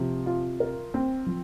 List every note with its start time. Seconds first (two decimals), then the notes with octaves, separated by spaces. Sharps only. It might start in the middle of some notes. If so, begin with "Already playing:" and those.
Already playing: C3 F3
0.26 F4
0.60 A#4
0.94 C4
1.26 F3